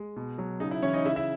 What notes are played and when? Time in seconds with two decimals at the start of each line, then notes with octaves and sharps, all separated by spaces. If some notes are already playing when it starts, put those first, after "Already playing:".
Already playing: G#3
0.16 B2
0.38 F#3
0.60 C#3 D#4
0.71 E4
0.82 E3 C#4 C#5
0.94 D#4 D#5
1.05 C#3 E4 E5
1.16 E4 E5